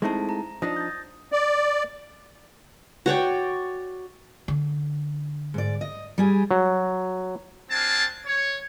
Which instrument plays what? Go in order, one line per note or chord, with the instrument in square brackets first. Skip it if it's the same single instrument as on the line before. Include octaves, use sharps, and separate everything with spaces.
[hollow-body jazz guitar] G#3 A3 C4 [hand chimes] D#4 E4 A5
[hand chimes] A#5
[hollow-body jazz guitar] F3 D4 D#4 [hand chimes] D#6 A#6
[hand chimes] G6 A6
[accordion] D5
[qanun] F#4 C#5 D5 G5
[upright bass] D3
[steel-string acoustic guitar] G#2 D5
D#5
G3 G#4 G#5
[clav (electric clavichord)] F#3
[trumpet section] C4 D4 F4 G#5 A5
C#5